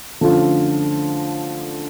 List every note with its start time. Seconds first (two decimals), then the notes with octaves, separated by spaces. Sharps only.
0.21 D3 F3 A3 C#4 F4